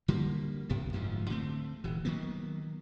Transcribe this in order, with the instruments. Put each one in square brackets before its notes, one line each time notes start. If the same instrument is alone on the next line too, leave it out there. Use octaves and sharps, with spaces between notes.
[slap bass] D3 G3 A#3
C2 F#2 C3 B3
D1 D2 G#2 F3
D3 A3 C4
D#1 E3
D#3 F#3 A#3 B3